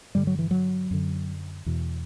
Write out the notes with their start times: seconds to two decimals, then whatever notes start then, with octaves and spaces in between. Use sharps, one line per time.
0.15 G2 D3 G3
0.27 F#3
0.39 E3
0.51 F#3
0.91 F#2 D3
1.66 E2 B2